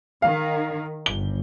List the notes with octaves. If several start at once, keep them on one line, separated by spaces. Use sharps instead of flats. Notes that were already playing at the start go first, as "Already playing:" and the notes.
D#3 F5
G1 G7